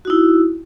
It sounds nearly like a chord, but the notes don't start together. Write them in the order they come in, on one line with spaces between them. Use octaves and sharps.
F#4 D#4 E4